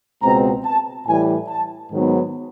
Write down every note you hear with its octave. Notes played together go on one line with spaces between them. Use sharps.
C#2 B2 G#3 C4 A#5
A5
A2 E3 G3 G#5
A5
G#2 D#3 F#3 B3